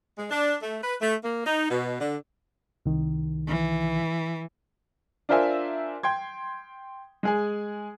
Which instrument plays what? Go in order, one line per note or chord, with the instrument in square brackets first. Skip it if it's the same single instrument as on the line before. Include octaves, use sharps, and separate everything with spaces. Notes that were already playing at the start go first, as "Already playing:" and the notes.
[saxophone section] G#3
D4
A3
B4
A3
A#3
D#4
B2
D3
[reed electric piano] C2 D#3
[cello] E3
[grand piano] D4 F4 A#4 C5 E5 G#5
G5 C6 G#6
G#3 G#4 G#5